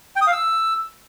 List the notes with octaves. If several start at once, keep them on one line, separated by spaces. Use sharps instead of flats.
G5
D#6
F5
E6